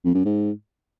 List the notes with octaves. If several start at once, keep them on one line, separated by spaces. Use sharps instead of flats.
F2
F#2
G#2